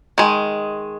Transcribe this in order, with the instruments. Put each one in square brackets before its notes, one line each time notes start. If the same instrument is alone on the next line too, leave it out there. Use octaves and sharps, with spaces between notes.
[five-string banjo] D#3 G#3